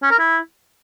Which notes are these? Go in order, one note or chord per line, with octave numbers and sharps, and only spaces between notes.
C#4
A#4
E4